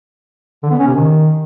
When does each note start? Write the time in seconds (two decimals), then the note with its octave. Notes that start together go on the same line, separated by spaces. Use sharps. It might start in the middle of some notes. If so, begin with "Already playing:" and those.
0.63 D3
0.71 B3
0.79 C#4
0.87 C3
0.95 D#3